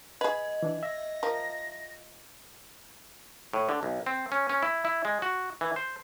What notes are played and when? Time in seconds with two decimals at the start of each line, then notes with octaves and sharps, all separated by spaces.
0.21 G#4 B4 D#5
0.63 E3 D4
0.83 E5 A#6
1.23 F3 A#4
3.53 A2
3.69 D3
3.83 B1
4.06 C4
4.32 C#4
4.49 C#4
4.63 E4
4.85 E4
5.05 G#3
5.22 F#4
5.61 E3
5.76 C5